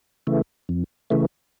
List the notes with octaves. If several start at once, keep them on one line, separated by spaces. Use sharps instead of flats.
C#3 E3 A3
F2
C#3 E3 A3